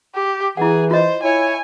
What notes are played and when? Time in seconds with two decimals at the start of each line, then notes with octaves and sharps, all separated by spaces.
0.15 G4
0.57 E3 E4 G#4 F#5
0.91 F4 C5 D#5
1.23 E4 C#5 G#5